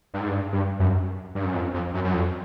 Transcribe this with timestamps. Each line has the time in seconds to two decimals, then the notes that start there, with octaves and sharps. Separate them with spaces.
0.14 G2
0.21 G#2
0.28 G2
0.53 G2
0.79 F#2
1.35 G2
1.44 F#2
1.54 F2
1.74 F2
1.94 F#2
2.04 F#2
2.13 F2